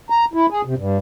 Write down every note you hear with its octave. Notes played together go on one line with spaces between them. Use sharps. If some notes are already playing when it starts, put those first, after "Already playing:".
A#5
E4
G#4
C3
G2